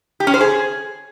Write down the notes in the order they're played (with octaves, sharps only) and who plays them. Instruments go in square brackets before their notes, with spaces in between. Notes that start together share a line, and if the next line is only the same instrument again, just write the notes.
[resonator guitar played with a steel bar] G4
C#4
C5
G#4